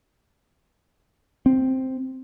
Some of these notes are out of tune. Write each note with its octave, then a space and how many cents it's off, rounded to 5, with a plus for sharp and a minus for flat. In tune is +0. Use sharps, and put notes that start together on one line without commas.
C4 +0